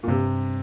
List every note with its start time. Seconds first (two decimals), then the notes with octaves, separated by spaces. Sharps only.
0.03 A#2
0.08 G2 C3